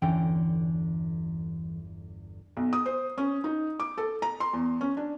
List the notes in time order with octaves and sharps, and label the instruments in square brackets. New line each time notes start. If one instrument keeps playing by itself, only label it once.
[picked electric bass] G1 E2 D3 [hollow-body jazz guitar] E3 C#4 G5
[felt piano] B1
D#6
C5
C#4
D#4
D6
A4
A#5
C6
E2
C#4
D4